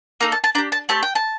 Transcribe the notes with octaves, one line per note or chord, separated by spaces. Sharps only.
A#3 D#4 A4 A#5
A5
A5
D4 G4 A#5
A5
A3 C4 G4 A5
G5
A5